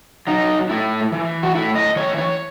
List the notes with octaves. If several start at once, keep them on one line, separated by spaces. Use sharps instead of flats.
F#3 D#4
A2 E4
E3
F#4
A2 E4
D#5
E3 C#5
C#5